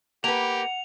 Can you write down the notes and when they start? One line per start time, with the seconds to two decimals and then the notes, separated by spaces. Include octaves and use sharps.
0.24 A#3 G4 B4 F#5 F7